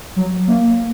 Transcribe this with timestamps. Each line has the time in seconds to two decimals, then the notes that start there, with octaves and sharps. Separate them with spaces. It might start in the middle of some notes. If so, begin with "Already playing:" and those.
0.16 F#3
0.47 A#3